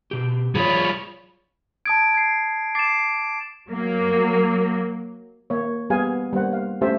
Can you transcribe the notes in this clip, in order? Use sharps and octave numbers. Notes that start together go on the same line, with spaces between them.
B2 G4
F#3 F4 G#4 C#5 D5 B5
A5 D#6 G#6 D7
G#6 C7
D6 A6 C7 E7
F#3 A#3
A#3 C#5
G3 B3 G4 G#4 F5 G#5
G3 A#3 C5 F#5
F5
A3 C#4 G4 C5 E5